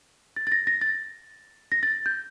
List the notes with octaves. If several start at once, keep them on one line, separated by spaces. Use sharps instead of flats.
A6
A6
A#6
A#6
A6
A#6
A6
G6